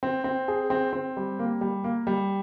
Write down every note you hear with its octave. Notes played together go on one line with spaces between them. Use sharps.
C4
C4
G#4
C4
C4
G3
A#3
G3
A#3
G3